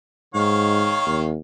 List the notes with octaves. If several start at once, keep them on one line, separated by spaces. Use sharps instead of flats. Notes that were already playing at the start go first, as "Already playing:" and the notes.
G#2 D#3 C#5 F5
D#2